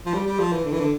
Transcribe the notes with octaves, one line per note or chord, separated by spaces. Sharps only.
F3
G3
G3
F3
E3
D3
E3
D3